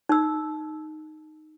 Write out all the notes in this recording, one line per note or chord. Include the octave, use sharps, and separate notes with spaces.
D#4 E6